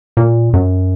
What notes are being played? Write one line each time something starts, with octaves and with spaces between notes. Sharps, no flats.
A#2
F#2